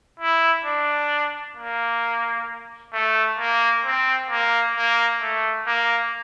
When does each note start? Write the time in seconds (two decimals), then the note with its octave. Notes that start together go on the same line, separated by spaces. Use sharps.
0.20 E4
0.64 D4
1.57 A#3
2.93 A3
3.38 A#3
3.85 C4
4.30 A#3
4.76 A#3
5.21 A3
5.66 A#3